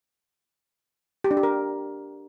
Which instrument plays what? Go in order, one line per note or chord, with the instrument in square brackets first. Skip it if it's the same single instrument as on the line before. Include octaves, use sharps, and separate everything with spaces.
[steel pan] G4
D4
G4
A#4